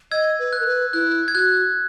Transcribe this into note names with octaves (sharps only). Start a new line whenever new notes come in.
D#5 E6 G#6
B4
F#6
A#4
B4
E4 F#6
G#6
F#4 F#6